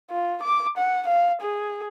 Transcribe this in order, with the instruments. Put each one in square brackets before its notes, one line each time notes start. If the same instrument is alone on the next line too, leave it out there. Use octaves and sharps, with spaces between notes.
[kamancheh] F4
D6
F#5
F5
G#4